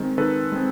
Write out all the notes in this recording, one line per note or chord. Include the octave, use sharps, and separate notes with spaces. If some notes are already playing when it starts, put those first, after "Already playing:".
Already playing: D#3 G#3 C4
D#3 A4 B4
G#3 C4